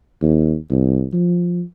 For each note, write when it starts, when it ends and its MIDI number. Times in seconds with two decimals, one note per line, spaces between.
0.22 0.56 39
0.71 1.06 36
1.13 1.63 53